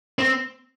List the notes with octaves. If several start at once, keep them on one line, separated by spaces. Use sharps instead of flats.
C4